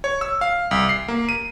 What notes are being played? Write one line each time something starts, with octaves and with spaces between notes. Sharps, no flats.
C#5
E6
F5
C2
C7
A#3
D#7